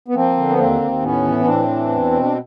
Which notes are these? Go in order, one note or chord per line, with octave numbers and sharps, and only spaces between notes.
B3
F3 A#3 C4
D3
B3
D#2 A#3 C4
D#2
A2 B3 C#4
E3
C#4
A2 C4 D4
E3
E2
B2
D4